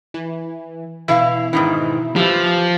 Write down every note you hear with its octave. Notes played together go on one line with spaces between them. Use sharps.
E3
B2 E3 E4 F5
G#2 D#3 E3
E3 F3 G4